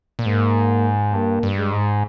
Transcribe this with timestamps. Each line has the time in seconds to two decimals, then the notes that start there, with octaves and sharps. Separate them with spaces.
0.19 A#2
0.26 G#2 A#3
1.13 G2 A#3
1.43 G2
1.58 G#3
1.73 G#2